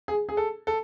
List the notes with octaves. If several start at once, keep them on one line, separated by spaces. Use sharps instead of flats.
G#4
G#4
A4
A4